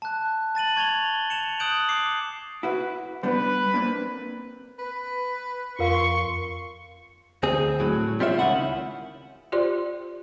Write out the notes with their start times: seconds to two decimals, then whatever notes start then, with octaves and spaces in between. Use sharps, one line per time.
0.02 A5 F#6
0.55 A5 A6 D#7 F#7
0.76 C#6 G#6 A6 F7 G7
1.30 C#7 E7 F7
1.60 D#6 F#6 G6 D7 F#7
1.89 D6 C7 C#7
2.63 E4 F#4 B4
3.23 G3 B3 D4 B4
3.74 A#3 C4 D4
4.79 B4
5.79 F2 F4 A#4 F5 C6 C#6
7.43 D2 C4 G#4
7.80 A2 F#3
8.20 G3 C4 F4 C#5 E5
8.39 C#2 D#3 C#4 E4 F#5
9.52 F4 G4 C5 D5 C6